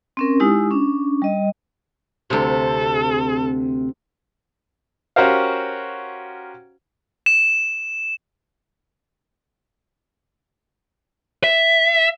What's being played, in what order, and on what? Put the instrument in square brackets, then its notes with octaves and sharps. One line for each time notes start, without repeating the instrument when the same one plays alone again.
[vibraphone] C4 C#4 A#4
G#3 D#4 E4 G4 D#6
C#4 D4
G3 D#5
[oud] D2 C3 [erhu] A4
[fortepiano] C#4 F#4 G4 A#4 C5 F5
[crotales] E7
[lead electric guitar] E5